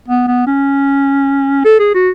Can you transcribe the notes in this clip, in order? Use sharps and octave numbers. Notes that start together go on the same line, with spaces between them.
B3
B3
C#4
A4
G#4
F#4